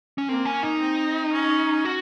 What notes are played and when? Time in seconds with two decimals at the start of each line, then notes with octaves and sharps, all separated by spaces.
0.18 C#4
0.29 A#3 C4
0.45 C#4
0.63 D#4
0.80 C4
1.33 C#4
1.85 F#4